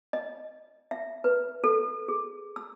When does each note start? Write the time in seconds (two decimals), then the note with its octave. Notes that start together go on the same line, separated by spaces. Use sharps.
0.13 D#5
0.91 E5
1.24 B4
1.64 A4
2.08 G#4
2.56 E6